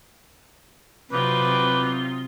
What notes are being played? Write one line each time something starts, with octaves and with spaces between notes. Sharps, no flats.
C3 F#3 G3 C4 D#4 F4 B4 D6